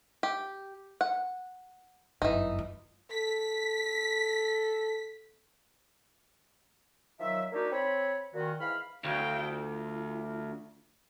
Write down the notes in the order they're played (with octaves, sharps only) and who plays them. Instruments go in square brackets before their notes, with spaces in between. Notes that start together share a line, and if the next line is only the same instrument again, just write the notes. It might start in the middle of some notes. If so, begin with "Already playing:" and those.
[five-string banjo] G4
F#5
[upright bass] G1 F#2 [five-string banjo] E3 D#4
[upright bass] F4
[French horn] A4 [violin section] B6
[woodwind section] D#3 F3 F#3 E5
A#3 D4 D#4 F#4 G4 A#4
C4 C#5 B5
A#2 D#3 F#4
G#2 E3 F5 B5 F6
[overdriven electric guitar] D2 [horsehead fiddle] F5 G5
[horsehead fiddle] F4